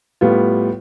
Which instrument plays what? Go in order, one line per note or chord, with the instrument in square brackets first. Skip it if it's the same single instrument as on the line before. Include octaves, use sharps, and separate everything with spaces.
[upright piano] A2 G3 B3 F4